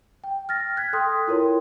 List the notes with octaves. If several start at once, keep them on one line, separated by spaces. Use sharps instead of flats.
G5
F6 A6 A#6
F#6 G#6 B6
A4 G5 C6 D#6
E4 F4 A#4 C#5 C6